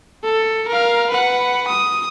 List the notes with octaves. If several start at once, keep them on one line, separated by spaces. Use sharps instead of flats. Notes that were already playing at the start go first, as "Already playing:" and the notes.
A4
A#4 F5
B4 F#5
D#6